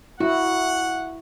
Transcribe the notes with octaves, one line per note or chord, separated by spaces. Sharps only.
E4 F#4 F#5